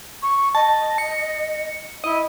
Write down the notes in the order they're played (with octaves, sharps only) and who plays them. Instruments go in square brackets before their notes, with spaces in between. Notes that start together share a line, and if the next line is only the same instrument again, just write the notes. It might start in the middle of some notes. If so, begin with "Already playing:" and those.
[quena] C#6
[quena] D#5 [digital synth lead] A5
[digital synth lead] C#7
[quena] E4 [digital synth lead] D#5